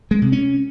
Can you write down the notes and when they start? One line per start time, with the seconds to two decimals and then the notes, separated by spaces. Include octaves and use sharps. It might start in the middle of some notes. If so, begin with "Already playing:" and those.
0.11 G#3
0.22 C3
0.32 C#4